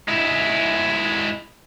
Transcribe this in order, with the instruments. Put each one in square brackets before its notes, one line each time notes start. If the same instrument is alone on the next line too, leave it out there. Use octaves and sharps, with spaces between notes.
[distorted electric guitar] G#3 E4